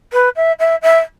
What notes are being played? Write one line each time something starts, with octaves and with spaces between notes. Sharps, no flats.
B4
E5
E5
E5